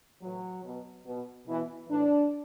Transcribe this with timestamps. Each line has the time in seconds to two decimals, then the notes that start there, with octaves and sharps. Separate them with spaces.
0.22 A2 E3 F#3
0.64 B2
1.05 B2
1.46 B2 E3
1.88 A2 E3 D4